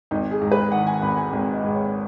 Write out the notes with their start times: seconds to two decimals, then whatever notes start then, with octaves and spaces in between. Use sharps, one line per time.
0.11 G#1 D#4
0.31 G#4
0.42 G#2
0.52 B4
0.72 D#3 F#5
0.87 G#5
1.02 G#1 B5
1.17 G#5
1.33 G#1
1.53 D#5
1.63 G#2
1.73 C#5